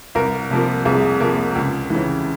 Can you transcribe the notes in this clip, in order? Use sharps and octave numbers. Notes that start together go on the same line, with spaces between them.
C2 A#4
C3 F3 A#3
C2 G#4
C3 F3 A#3
C#2
C#3 E3